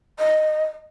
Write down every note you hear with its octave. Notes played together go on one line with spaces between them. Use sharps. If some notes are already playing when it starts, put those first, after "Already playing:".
D#5